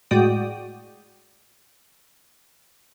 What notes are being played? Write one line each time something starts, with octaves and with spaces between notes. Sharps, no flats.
A2 G#3 F#4 D5 G5 D#6